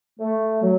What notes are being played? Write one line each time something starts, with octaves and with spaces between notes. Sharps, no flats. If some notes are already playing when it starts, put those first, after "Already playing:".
A3
F#3